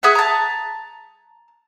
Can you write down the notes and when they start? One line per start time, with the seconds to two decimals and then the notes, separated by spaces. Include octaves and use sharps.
0.03 G#4 B4 E5 F#5
0.15 A5 A#5